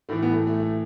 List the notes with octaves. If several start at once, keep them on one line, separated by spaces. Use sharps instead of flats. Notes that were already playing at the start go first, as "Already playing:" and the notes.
A2 E3 A3
B3
A3
A3
A3